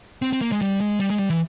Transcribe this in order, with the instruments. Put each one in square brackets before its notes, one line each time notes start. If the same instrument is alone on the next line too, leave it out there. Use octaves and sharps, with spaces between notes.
[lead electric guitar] C4
C4
A#3
G#3
G3
G#3
G3
G#3
G3
E3